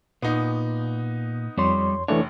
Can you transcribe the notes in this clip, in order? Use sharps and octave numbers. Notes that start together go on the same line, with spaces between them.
A#2 B3 D#4
F2 G3 C#5 C6
F1 E3 A3 D4 C#5